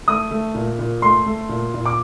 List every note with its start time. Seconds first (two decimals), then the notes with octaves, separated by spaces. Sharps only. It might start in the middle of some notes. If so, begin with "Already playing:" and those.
0.08 A3 D#6
0.31 A3
0.54 A#2
0.79 A#2
1.02 A3 C6
1.26 A3
1.49 A#2
1.74 A#2
1.86 D6